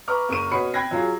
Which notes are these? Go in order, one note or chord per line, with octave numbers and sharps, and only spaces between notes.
B4 A#5 C#6 D6 F6
F#1 A#4 C#6 D#7
B2 F#4 C#5 B5 C7 C#7
G5 B5 F#6 G#6 A#6 C7
F#3 F4 G#4